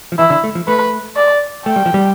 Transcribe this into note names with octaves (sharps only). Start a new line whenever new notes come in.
F3
E3 E4
D3
A3
F3
A3 B4
D5
A3 G5
G3
F3
G3